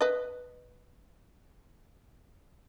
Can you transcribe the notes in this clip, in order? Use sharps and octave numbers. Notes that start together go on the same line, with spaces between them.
B4 D#5